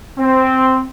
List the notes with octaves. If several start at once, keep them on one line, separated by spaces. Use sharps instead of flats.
C4